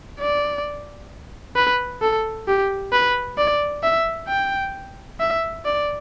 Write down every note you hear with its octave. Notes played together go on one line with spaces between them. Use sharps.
D5
B4
A4
G4
B4
D5
E5
G5
E5
D5